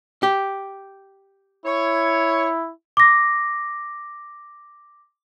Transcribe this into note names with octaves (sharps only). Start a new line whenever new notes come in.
G4
E4 C#5
D6 A#6